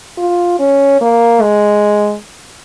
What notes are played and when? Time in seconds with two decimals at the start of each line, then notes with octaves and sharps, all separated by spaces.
0.18 F4
0.59 C#4
1.01 A#3
1.41 G#3